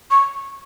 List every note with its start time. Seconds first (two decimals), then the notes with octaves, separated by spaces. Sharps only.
0.11 C#6